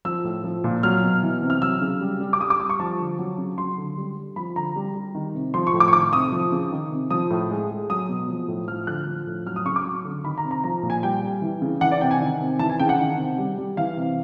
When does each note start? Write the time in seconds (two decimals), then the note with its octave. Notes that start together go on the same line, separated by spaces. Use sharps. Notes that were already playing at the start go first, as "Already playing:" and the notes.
0.05 F3 E6
0.24 A2
0.44 F3
0.64 A#2
0.83 F#3 F6
1.03 B2
1.23 E3
1.42 C3
1.50 F6
1.62 F#3 E6
1.81 C#3
2.01 G3
2.20 G3
2.33 D6
2.40 G3 D#6
2.50 D6
2.60 G3 D#6
2.70 C#6
2.79 F3 A5
2.99 D3
3.19 F#3
3.38 C#3
3.58 F#3 C6
3.78 D3
3.97 G3
4.17 G3
4.36 F3 B5
4.56 D3 A#5
4.76 G3
4.95 G3
5.15 D#3
5.34 C3
5.54 F3 C6
5.67 C#6
5.74 A2
5.80 D6
5.88 C#6
5.93 D#3 D6
6.13 C3 D#6
6.32 F3
6.52 C#3
6.72 D#3
6.91 C3
7.10 F3 D#6
7.30 A2
7.50 G#3
7.70 G#3
7.89 F#3 D#6
8.09 B2
8.29 F3
8.48 A2
8.67 F3 F6
8.87 D3 F#6
9.07 F3
9.27 A2
9.46 F#3 F6
9.56 D#6
9.66 C#3 C#6
9.76 D6
9.85 F#3
10.05 D3
10.24 D#3 B5
10.38 A#5
10.44 C3
10.51 A#5
10.64 F3 A#5
10.83 A#2
10.90 G#5
11.03 G3 G5
11.23 G3
11.42 E3
11.62 C#3
11.81 E3 F#5
11.91 D5
12.01 C3 G5
12.11 G#5
12.21 D#3
12.41 C3
12.59 E3 A5
12.70 G#5
12.80 C#3 G5
12.89 F#5
12.99 D#3
13.18 C3
13.38 G3
13.58 G3
13.77 E3 F5
13.97 C3